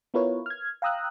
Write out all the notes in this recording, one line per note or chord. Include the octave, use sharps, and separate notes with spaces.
B3 E4 F4 A#4 B4 C#5
F6 G#6
F5 G5 A#5 D#6 E6 F#6